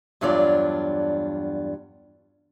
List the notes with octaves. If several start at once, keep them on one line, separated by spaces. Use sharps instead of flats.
E2 G2 F#3 D4 F4 D5